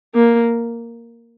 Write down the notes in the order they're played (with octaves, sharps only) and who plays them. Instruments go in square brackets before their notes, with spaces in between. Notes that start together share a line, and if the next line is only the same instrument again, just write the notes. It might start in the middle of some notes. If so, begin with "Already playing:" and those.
[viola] A#3